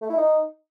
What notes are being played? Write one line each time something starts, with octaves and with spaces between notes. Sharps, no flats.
A3
E4
D#4